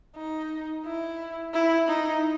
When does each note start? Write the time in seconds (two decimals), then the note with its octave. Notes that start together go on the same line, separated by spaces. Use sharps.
0.16 D#4
0.85 E4
1.54 E4
1.88 D#4